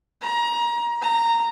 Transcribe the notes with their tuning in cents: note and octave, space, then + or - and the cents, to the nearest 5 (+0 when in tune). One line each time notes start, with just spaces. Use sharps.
A#5 +25
A#5 -10